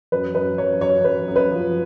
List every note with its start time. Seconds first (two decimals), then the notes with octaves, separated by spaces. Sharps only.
0.12 F#2 B4
0.35 F#2 B4
0.58 F#2 C#5
0.81 F#2 C#5
1.04 F#2 B4
1.28 F#2
1.36 B4
1.51 F3